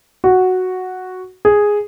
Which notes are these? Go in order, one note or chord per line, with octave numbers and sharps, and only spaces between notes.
F#4
G#4